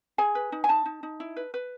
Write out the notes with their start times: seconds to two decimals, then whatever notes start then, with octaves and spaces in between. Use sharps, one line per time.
0.18 G#4 G#5
0.35 B4
0.52 D#4
0.64 G#5
0.69 D#4 A5
0.85 D#4
1.03 D#4
1.20 E4
1.36 B4
1.54 B4